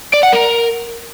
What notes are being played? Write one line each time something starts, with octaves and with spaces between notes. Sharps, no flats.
D5
F#5
A#4